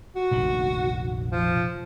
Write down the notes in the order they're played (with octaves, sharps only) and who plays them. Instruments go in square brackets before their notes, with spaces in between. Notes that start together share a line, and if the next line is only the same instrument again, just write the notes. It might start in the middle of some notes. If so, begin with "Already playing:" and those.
[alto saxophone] F#4
[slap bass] F1 A#1 D#3
[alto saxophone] F3